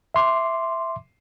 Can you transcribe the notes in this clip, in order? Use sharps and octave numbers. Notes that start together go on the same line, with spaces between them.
E5 C6 D6